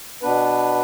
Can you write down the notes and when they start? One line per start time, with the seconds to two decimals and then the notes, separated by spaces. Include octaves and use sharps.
0.23 B2 B3 D4 B4